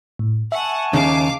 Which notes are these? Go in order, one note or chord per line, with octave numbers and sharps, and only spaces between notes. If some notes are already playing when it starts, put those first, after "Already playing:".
A2
E5 F#5 G#5 A5 C#6
D#2 C#3 F5 D6